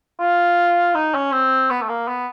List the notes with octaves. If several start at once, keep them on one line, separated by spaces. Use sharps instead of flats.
F4
D#4
C#4
C4
B3
A3
A#3
B3